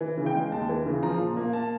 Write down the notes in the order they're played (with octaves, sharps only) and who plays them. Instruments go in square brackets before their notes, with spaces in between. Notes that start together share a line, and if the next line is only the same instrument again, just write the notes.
[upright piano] E3
C#3
G5
G#3
D#2 A5
E3
C#3
F3 A#5
A#2
A#3
A5